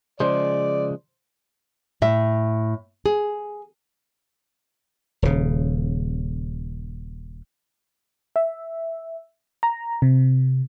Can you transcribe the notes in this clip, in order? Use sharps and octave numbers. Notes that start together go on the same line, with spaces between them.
C#3 F3 G#3 C5 D5
A2 E5
G#4
D#1 C#3
E5
A#5
C3